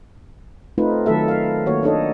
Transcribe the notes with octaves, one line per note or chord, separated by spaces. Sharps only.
A3 C4 D#4 F4 B4
D#3 F#3 A3 A4 E5
A#4 F5
D#3 A#3 F#4 C#5
D4 D#4 A4 C#5 D#5